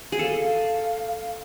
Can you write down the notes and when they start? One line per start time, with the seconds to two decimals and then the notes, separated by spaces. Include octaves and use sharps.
0.12 G#4
0.19 A4 F5